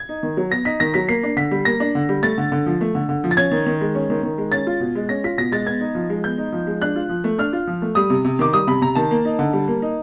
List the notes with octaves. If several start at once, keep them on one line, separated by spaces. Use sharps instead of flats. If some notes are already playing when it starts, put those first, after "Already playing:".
Already playing: G#6
D#4
D#3
F#3
B3 A#6
D#4 B6
D#3 A#6
F#3 B6
A#3 C7
D4
D3 B6
G3
A#3 A#6
D4
D3
G3
A3 A6
D3
D3
F3
A3
D3
D3
F3
A6
C#4 G#6
D#3
D#3
G#3
C#4
D#3
D#3
G#3
C#4 A6
F4
B2
G#3
C#4 A#6
F4 B6
B2 A#6
G#3 A6
B3 G#6
D#4
F3
G#3
B3 G6
D#4
F3
G#3
D4 F#6
F4
F3
A3
D4 F6
F4
F3
A3
G3 D#6
C3
C3
D#3 D6
G3 D#6
C3 B5
C3 A#5
D#3 A5
A#3
D#4
D3
G3
A#3
D#4